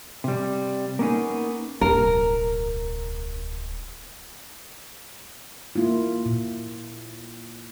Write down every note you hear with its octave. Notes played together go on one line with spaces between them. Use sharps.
C3 G3
A#3 B3 C#4 D#4 G#4
D1 B1 A#4
A#3 E4 F4
A#2